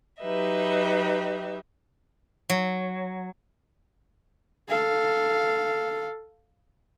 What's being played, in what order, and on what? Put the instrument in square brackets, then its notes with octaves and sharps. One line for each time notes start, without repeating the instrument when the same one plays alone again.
[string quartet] F#3 D#4 G4 B4 D#5 E5
[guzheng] F#3
[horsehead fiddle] A4 F5